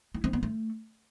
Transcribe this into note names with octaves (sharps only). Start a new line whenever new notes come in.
E4
C4
B3
A3